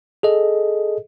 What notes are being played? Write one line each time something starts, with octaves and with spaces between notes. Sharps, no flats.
G#4 A4 D#5